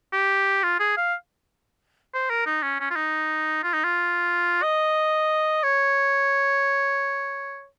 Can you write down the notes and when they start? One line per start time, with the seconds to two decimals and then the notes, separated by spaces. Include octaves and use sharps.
0.13 G4
0.63 F4
0.80 G#4
0.97 F5
2.14 C5
2.30 A#4
2.46 D#4
2.63 C#4
2.80 C#4
2.90 F4
2.96 D#4
3.63 F4
3.73 D#4
3.84 F4
4.63 D#5
5.63 C#5